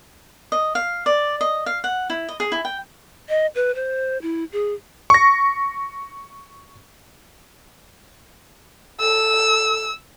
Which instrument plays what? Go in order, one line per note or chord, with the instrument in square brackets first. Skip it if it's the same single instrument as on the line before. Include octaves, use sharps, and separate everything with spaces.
[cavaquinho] D#5
F5
D5
D#5
F5
F#5
E4
D#5
G#4
E4
G5
[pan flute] D#5
B4
C5
E4
G#4
[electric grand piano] C#6 A#6
[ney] A4 [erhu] E6